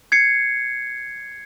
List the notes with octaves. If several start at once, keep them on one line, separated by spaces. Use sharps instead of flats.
G#6 C7 C#7